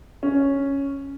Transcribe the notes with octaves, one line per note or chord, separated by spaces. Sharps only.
C#4